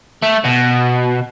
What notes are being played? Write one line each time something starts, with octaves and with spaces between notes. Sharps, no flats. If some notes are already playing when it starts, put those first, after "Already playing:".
A3
B2